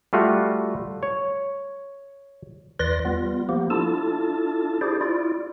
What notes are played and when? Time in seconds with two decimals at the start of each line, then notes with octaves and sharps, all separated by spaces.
0.13 G3 A3 F4 F#4
1.03 C#5
2.79 E2 E3 B4 D5 C6 A#6
3.05 G3 B3 F4
3.49 F3 A#3 B3 G4
3.70 D4 E4 F4 A4 A5
4.81 E4 G4 G#4 C5 D5
5.01 E4 F4 D5